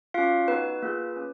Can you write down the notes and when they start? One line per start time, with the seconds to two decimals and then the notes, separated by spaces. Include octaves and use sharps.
0.14 C#4 F4 F#4 F5
0.48 B3 D#4 F#4 B4
0.83 A#3 F4 G#4
1.16 C#4